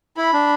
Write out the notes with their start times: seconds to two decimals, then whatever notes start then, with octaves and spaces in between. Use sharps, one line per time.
0.17 E4 B5
0.33 D4